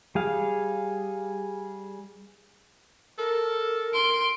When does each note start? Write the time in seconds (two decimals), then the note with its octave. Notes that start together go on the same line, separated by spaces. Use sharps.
0.15 G3 G#4 F5
3.18 A4 A#4
3.94 C6 D7